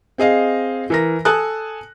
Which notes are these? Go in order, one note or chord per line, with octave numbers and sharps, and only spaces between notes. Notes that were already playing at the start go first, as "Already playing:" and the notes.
C4 G#4 D#5 F5
E3 A#4 A#6
A4 G#5 A5 D#6 F#6